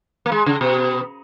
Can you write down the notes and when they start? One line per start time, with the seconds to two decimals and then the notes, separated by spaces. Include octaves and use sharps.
0.26 A#3
0.32 G#3
0.46 C#3
0.61 B2